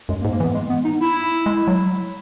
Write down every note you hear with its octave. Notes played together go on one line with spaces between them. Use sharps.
F#2 G#3
A#3
G#2
A#3
E3 B3
G#3
B3
D#4
E4
G#3
F#3